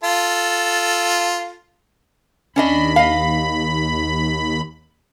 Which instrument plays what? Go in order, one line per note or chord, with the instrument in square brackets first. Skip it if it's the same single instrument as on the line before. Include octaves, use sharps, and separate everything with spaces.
[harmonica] F4 A4
[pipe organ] D#2 B5 [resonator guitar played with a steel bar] C#4 D4 D#5
[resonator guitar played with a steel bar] D#5 F5